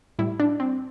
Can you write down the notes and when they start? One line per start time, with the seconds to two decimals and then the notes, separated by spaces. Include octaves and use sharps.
0.19 A2 G3 E4
0.40 D4
0.60 C4